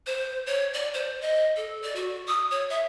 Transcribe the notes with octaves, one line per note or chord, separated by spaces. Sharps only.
C5
C#5
D5
C5
D#5
A4
D5
F#4
D#6
C#5
E5